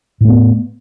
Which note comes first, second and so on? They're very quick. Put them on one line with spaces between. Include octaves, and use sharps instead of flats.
A2 A3 B3